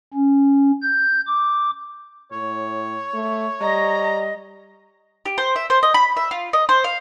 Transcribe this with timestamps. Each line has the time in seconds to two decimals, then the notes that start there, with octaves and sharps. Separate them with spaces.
0.14 C#4
0.82 G6
1.27 D6
2.32 A2 C#5
3.14 A3
3.61 G3 D#5 A#5
5.26 G4
5.38 C5
5.56 E5
5.70 C5
5.83 D#5
5.94 B5
6.17 E5
6.31 F4
6.53 D#5
6.69 C5
6.84 F5